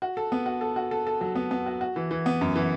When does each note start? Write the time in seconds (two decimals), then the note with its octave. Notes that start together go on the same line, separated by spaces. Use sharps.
0.02 F#4
0.17 A4
0.32 B3
0.46 F#4
0.61 A4
0.76 F#4
0.91 A4
1.07 A4
1.21 F#3
1.35 B3
1.51 B3
1.66 F#4
1.81 F#4
1.96 E3
2.11 E3
2.26 B3
2.41 F#2
2.56 E3